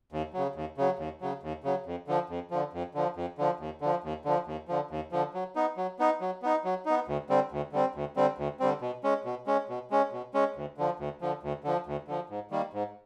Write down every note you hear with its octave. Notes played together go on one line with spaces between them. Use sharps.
D#2
C#3 F#3
D#2
C#3 F#3
D#2
C#3 F#3
D#2
C#3 F#3
F2
D3 F3
F2
D3 F3
F2
D3 F3
F2
D3 F3
D#2
D3 F3
D#2
D3 F3
D#2
D3 F3
D#2
D3 F3
F#3
B3 D#4
F#3
B3 D#4
F#3
B3 D#4
F#3
B3 D#4
D2
D3 G3 C4
D2
D3 G3 C4
D2
D3 G3 C4
D2
D3 G3 C4
B2
G#3 C#4
B2
G#3 C#4
B2
G#3 C#4
B2
G#3 C#4
D2
D3 F3
D2
D3 F3
D2
D3 F3
D2
D3 F3
G#2
D#3 G3 A#3
G#2